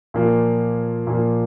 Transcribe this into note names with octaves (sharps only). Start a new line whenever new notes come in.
A#2 F3 A#3 F4
A#2 F3 A#3 F4